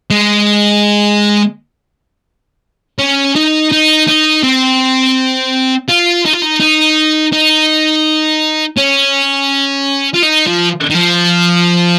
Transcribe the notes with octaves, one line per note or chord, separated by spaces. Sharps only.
G#3
C#4
D#4
D#4
D#4
C4
F4
D#4
F4
D#4
D#4
D#4
C#4
F4
D#4
F3
D#3
F3